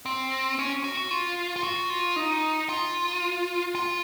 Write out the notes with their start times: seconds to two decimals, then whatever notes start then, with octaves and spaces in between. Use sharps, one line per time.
0.06 C4
0.59 C#4
0.84 F#4
0.97 F#4
1.11 F4
1.56 F4
1.63 F#4
1.90 F4
2.16 D#4
2.69 F4
3.75 F4